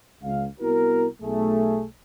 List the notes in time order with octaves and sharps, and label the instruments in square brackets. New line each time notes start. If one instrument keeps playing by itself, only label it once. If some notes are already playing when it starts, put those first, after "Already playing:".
[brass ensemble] C#2 F5
C2 B3 E4 F#4 A#4
B1 A3 G#4